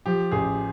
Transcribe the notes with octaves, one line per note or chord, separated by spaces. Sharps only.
F3 G4
A1 G#4